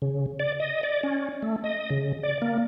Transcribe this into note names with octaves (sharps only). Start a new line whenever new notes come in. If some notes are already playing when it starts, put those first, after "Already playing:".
C#3
D5
D#5
D5
C#4
A3
D#5
C#3
D5
A#3